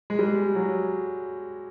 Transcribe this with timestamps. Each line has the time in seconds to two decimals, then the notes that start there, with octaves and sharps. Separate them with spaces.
0.10 G#3
0.19 G3
0.27 G#3
0.55 F#3